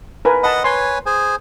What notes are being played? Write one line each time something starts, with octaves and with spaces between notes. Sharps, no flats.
A#4 B4 G#5
D#5 F#5 A5 B5
B4 C#5 G#5 C6
G#4 C5 G#5